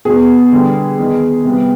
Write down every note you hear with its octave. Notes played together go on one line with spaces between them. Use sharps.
B2 B3 G#4
D3 G3 B3
D#3 B3
C3 G3 B3